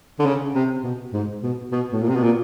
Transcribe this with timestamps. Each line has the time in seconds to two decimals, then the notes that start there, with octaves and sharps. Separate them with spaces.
0.19 D3
0.25 C#3
0.55 C3
0.83 B2
1.13 G#2
1.43 B2
1.72 B2
1.93 A2
2.01 A#2
2.08 C3
2.16 B2
2.23 A#2